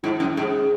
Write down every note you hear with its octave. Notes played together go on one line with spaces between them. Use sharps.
G#2 E4
F#2
G#2 G#4